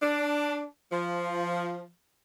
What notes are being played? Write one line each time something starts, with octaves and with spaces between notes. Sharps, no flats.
D4
F3